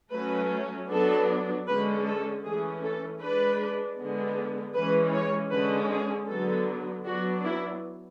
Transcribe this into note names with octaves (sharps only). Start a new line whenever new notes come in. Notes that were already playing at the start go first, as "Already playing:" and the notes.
F#3 A3 C#4 B4
F#3 B3 D4 A4
D3 G#3 C#4 B4
A4
E3 A3 C#4 G#4
A4
G#3 D4 B4
D3 G#3 B3
E3 G#3 C#4 B4
C#5
D3 G#3 C#4 B4
G#4
D3 F#3 B3 A4
F#3 B3 D4 F#4
E4